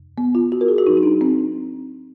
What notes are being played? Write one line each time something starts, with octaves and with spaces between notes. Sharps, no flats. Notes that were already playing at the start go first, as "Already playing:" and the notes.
Already playing: F2 C3
B3
F4
F#4
A#4
G#4
F#4
A2 F#3 D#4
D#4
D4
C4